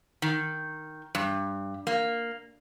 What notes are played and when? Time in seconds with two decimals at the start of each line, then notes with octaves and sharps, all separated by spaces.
0.22 D#3
1.15 G2
1.87 A#3